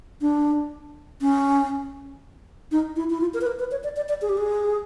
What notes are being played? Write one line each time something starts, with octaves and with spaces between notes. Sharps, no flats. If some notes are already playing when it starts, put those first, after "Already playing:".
D4
C#4
D#4
E4
E4
F4
A#4
B4
A#4
B4
C#5
D5
D5
D5
G#4
G4
G#4